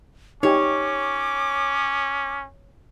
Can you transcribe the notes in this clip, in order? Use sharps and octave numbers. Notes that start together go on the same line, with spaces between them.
C#4 D#4 G4 C#5 G#5 D6